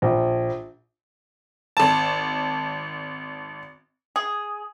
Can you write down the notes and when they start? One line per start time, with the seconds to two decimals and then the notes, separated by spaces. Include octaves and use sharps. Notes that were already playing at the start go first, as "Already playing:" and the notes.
0.02 A#1
1.77 G#1 A5
4.16 G#4